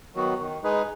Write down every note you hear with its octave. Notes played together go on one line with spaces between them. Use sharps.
D#3 F#3 B3 F#4
D#3
G#3 D#4 G#4 B4